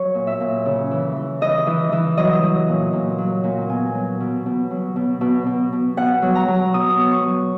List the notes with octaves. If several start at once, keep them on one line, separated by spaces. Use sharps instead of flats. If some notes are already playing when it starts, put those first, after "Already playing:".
Already playing: F#3 C#5
A#2
E5
A#2
C#3
E3
E3
E3 D#5
E3
E3
F#3 D#5
F#3
A#2
A#2
F#3
A#2
B2 G#5
F#3
B2
B2
F#3
B2
B2
B2
B2
B2 F#5
F#3
A#5
F#3
B2 D#6
B2
C#6
F#3